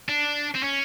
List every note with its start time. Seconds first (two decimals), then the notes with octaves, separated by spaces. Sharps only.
0.09 D4
0.55 C4
0.64 C#4